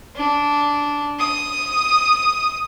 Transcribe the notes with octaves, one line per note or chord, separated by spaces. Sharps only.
D4
D#6